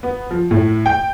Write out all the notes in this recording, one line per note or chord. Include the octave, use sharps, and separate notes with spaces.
B3
F3
A2
G5